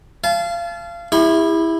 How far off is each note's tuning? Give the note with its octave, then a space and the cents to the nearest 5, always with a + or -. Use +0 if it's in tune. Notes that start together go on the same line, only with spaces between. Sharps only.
F5 -25 A5 -35
E4 -5 G4 +45 C6 +35